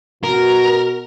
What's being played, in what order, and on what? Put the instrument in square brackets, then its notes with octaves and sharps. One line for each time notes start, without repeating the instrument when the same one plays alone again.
[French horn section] B2 F#4 [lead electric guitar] A#4